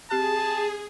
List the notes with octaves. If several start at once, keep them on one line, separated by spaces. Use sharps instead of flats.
C4 G4 G#4 A5 F#6